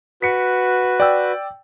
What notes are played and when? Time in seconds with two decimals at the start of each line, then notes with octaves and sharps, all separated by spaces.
0.22 F#4 B4 B6 C#7
1.00 D5 G5 E6